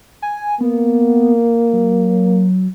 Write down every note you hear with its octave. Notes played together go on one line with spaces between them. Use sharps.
G#5
A#3 B3
F#3